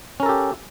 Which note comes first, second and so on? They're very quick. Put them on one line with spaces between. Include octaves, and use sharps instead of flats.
C#4 A#4 A4 G4